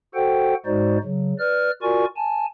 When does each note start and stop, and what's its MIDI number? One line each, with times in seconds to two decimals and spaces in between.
0.15 0.54 66
0.15 0.54 69
0.15 0.54 72
0.15 0.54 78
0.15 0.54 79
0.66 0.98 44
0.66 0.98 56
0.66 0.98 63
0.66 0.98 66
0.66 0.98 72
0.66 0.98 74
1.03 1.33 49
1.03 1.33 54
1.39 1.71 71
1.39 1.71 74
1.39 1.71 89
1.82 2.05 65
1.82 2.05 66
1.82 2.05 70
1.82 2.05 74
1.82 2.05 80
1.82 2.05 85
2.16 2.46 80
2.16 2.46 81